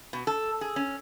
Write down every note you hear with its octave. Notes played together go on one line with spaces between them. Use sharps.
B2
A4
G#4
C#4